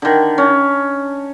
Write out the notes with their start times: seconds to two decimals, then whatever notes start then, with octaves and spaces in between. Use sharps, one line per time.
0.02 D3 D#3
0.38 C#4